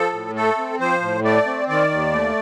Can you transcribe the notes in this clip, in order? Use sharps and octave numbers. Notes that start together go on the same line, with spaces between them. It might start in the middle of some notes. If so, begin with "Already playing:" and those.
Already playing: F3 A4
A2
A3 A4
C4
F3 C5
A2
A3 D5
C4
D#3 D5
D#2
A3